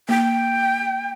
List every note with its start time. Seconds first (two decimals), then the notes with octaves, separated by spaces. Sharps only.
0.09 A#3 G5